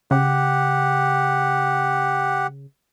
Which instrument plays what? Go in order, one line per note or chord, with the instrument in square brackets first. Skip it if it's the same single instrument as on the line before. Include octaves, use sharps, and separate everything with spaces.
[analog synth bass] C#3 [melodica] G4 F#5